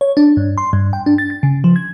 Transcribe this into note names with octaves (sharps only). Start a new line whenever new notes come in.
C#5
D4
G2
C6
G2
G5
D4
A6
A6
C#3
F3
G#6